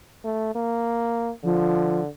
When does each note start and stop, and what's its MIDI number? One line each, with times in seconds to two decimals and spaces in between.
0.24 0.53 57
0.55 1.32 58
1.43 2.08 50
1.43 2.01 53